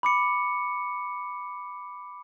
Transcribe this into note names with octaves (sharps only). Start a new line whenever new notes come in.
B5 D6 C#7